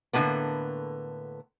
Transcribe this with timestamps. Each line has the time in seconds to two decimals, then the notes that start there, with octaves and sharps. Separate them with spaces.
0.13 A2 D3 F3 G#3 A#3 B3